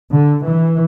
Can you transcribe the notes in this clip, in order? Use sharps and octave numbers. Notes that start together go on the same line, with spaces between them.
D3
E3